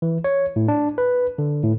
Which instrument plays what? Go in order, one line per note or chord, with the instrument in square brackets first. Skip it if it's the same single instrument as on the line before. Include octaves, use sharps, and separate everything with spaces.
[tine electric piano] E3
C#5
A2
D4
B4
D3
A2